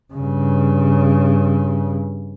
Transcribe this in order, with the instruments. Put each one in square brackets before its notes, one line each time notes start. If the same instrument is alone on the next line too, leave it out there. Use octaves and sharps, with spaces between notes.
[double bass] G2 C#3